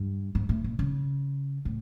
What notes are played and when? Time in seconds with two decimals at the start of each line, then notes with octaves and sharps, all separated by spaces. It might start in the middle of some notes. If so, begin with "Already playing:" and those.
Already playing: G2
0.35 G#2
0.49 A2
0.64 A#2
0.79 C#3
1.65 A2